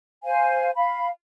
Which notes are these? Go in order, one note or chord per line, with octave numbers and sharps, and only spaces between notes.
C5 F5 G#5
F5 B5